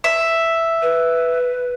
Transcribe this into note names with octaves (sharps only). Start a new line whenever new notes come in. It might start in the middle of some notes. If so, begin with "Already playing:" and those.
E5
B4